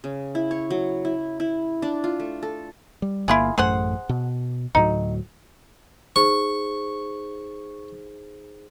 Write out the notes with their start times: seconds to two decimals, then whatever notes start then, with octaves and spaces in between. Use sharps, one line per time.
0.04 C#3
0.35 E4
0.51 C#5
0.70 F#3
1.05 E4
1.40 E4
1.82 D4
2.04 F4
2.20 A3
2.43 A4
3.02 G3
3.28 G1 A#3 E4 F4 G#4
3.58 A1 F#2 A3 G#4 C5 F#5
4.09 B2
4.75 D2 A2 F#3 D#4
6.16 D#4 G#4 C5 C#6